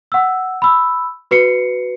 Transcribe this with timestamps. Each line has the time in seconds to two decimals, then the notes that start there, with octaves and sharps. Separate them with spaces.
0.12 F#5 E6
0.62 B5 E6
1.31 F#4 B4 C7 C#7